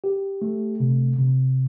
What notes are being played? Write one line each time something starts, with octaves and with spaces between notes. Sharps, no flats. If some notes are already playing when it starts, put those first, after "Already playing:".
G4
A3
C3
C3